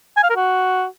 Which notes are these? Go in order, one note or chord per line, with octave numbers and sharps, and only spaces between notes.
G#5
F5
A#4
F#4